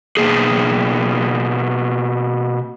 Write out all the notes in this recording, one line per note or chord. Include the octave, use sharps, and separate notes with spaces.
B2 D#3 A#3 G#4